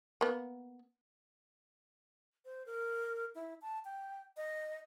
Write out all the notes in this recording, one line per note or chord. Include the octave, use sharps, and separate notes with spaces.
A#3 B3
C5
A#4
E4
A5
G5
D#5